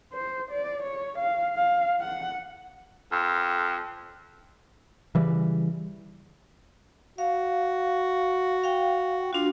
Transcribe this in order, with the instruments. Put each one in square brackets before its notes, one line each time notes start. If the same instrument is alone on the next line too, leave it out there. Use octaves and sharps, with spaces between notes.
[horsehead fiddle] C5
D5
C#5
F5
F5
F#5
[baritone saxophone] F2
[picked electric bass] C#3 E3 G3
[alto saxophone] F#4 [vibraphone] F5
[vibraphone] F5 G5
[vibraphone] D4 F#4 [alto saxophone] F4